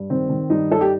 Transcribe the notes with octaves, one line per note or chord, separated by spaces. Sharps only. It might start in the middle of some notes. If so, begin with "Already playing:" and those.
Already playing: G2
D#3 C4
D#3
G2 D#4
G2 A4
G4